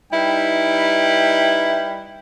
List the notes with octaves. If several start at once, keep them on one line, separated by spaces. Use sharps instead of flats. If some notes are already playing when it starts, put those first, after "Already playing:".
G3 D#4 E4 B4 G5